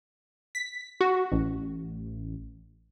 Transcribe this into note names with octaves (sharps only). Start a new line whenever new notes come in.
B6
F#4
A1